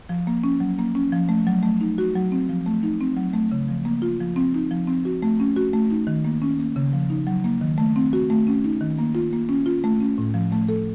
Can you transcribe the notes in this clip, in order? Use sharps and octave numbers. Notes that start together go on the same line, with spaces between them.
F3
A#3
C#4
F#3
A#3
C#4
F3
A3
F#3
A3
D#4
F#4
F#3
C4
F3
A3
D#4
C4
F#3
A3
C#3
F3
A#3
F4
F3
C4
D#4
F3
C4
F#4
A3
C#4
F#4
A3
D#4
D#3
A#3
C#4
A#3
C#3
F3
D#4
F#3
A#3
D#3
A3
C4
F#4
A3
C#4
D#4
D#3
A#3
F4
A#3
C#4
F4
A3
C#4
A2
F3
A3
A4